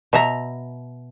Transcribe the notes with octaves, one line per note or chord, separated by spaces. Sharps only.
B2 E5 A#5